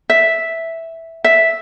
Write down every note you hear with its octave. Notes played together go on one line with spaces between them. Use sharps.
E5
E5